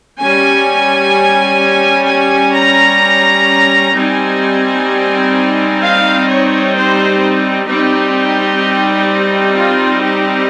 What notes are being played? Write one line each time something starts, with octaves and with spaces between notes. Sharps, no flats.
G3 C#4 G#5
G#5
A#5
G3 C4 D#4 G#5
F5
C#5
C5
G3 C4 D#4 G4
F4
G4